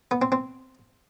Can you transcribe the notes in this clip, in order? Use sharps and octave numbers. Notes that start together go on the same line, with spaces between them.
B3
C4
C4